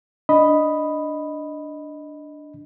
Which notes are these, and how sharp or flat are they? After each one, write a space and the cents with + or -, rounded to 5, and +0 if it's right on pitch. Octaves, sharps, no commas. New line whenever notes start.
D4 +0 D#5 +0 B5 +0